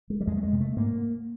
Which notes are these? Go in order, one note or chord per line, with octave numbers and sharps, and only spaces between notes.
G#3
G3
F2 G#3
A3
G#3
C3
A3
G#2 A#3